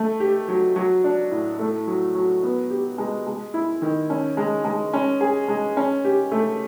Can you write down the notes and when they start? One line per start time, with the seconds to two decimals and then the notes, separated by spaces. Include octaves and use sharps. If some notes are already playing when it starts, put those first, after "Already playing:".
Already playing: A3
0.20 G4
0.48 F#3
0.76 F#3
1.04 D4
1.31 A2
1.59 A3
1.87 F#3
2.15 F#3
2.43 B3
2.70 G4
2.98 G#3
3.27 G#3
3.54 E4
3.82 D#3
4.10 C#4
4.37 G#3
4.65 G#3
4.94 C#4
5.21 G#4
5.48 G#3
5.77 C#4
6.05 G4
6.32 A3